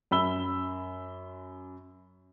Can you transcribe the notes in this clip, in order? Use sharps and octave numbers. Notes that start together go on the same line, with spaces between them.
F#2 B5 E6 G7